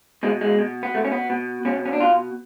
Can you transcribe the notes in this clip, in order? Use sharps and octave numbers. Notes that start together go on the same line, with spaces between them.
B2 G#3
G#3
B2
B3
B2 A3
C#4
B3
B2
B2 C#4
C#4
D4
B2 F4